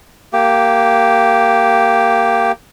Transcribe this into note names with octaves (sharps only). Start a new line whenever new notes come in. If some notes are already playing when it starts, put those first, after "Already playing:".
A#3 G4